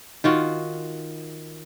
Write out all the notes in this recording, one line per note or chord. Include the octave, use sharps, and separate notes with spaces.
D#3 F4 F#4